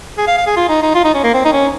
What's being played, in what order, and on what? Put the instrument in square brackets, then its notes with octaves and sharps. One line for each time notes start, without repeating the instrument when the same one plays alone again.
[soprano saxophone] G#4
F5
F5
G#4
F4
D#4
D#4
F4
D#4
C#4
A#3
C4
D#4
C#4